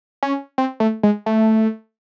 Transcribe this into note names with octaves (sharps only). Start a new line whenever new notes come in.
C#4
C4
A3
G#3
A3